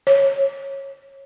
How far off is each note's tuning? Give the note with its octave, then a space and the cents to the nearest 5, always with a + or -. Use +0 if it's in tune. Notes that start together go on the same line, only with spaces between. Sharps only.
C#5 -20